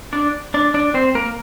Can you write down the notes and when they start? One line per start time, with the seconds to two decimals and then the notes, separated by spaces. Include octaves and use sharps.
0.13 D4 D5
0.54 D4 D5
0.74 D4 D5
0.94 C4 C5
1.15 A#3 A#4